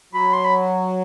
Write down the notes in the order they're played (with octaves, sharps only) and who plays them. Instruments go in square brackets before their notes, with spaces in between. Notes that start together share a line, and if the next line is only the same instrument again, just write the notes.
[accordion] F#3 [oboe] B5
[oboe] C6
B5